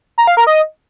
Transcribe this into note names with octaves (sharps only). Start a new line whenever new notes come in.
A#5
F5
A#4
D#5